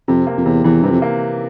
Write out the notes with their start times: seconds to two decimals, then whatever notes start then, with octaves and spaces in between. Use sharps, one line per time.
0.08 F2 C3
0.27 A#3
0.38 F2
0.45 E2 C3
0.64 E2 E3
0.83 G2 C3
0.90 F2
1.02 A#3